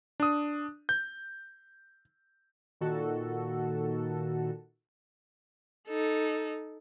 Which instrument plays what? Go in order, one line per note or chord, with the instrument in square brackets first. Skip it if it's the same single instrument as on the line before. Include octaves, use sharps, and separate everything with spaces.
[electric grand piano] D4 D#6
G6
[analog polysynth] A#2 D#3 F#4 A4
[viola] D#4 A4